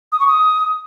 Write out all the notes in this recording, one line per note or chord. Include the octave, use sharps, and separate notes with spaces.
D#6
C#6
D#6